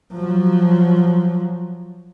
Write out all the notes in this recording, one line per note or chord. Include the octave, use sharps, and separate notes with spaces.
F3 F#3